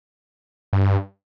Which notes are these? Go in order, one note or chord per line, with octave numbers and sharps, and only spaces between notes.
G2